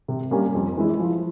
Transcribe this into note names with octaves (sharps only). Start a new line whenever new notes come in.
C3
G3 A#3 C#4
F2
E3 G#3 E4
F3